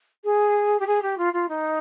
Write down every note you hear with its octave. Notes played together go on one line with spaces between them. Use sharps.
G#4
G4
G#4
G4
F4
F4
D#4